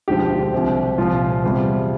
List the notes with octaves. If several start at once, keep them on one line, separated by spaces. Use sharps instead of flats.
E1 D2 D3 F3 G4
C2 C3 F3
C2 A#2 F3 F4
E2 C3 G3